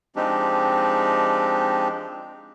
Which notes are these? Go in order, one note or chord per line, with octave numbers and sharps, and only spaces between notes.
F3 G#3 C4 D4 D#4 G4